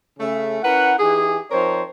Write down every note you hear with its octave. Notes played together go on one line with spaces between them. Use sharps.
C#3 A3 C#4
C#4 E4 A#4 B4 F#5
E3 D#4 G4 G#4
F3 C4 D#4 A#4 C5 C#5